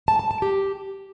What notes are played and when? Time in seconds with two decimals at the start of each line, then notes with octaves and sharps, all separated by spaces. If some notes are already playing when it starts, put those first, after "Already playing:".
0.08 A5
0.19 A5
0.31 A5
0.42 G4